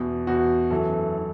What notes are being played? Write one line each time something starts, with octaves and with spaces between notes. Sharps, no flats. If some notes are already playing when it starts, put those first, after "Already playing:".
Already playing: E2 B2
E2 B2 F#4
F#2 E3 A4
A4
E3